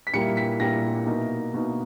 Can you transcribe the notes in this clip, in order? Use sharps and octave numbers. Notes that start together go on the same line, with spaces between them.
B6
A#2 G3 A#3 E4 C#7
B6
A#2 G3 A#3 E4 A#6
B2 A#3 D#4
B2 A#3 D#4